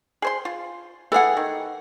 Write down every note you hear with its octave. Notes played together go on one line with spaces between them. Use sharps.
G#4 C5 C6
F4
E3 G#4 A4 F#5
D#3